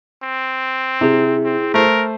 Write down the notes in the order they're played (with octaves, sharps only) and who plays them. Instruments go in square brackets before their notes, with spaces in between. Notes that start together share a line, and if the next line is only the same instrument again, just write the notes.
[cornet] C4
[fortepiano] C3 [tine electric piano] E4 G#4
[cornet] C4
[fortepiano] A3 C5 [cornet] A#4